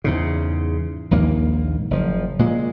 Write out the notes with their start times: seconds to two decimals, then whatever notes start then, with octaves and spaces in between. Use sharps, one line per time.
0.04 E2 G#2 C#3
1.11 A#1 D#2 G#2 A#3
1.91 F#1 F3
2.39 A#2 G#3